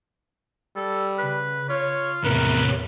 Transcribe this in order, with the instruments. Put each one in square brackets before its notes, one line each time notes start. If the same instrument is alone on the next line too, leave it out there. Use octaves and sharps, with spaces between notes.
[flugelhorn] G3 [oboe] A4
[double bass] C#3 [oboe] B4
[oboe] F4 [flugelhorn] C#5
[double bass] E2 [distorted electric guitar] A2 C3 [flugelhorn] A#4 [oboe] B4